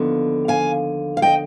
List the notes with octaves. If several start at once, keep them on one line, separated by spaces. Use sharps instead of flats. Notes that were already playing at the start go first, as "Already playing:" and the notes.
Already playing: D#2 D3 F3 B3
F5 G#5
F5
D#5 G5